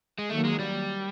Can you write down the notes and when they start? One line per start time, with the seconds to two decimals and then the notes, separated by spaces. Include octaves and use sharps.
0.18 G#3
0.29 D#3 F#3 A3 A#3
0.45 G#3
0.59 G3